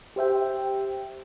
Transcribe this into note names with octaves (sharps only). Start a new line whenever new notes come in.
G4 C5 E5 G5